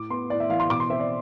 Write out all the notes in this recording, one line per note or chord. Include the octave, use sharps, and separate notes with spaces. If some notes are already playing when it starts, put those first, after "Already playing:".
Already playing: A2 D6
B3 C6
A2 D5
E5
E3 F5
C6
B2 D6
C6
C4 E5
D5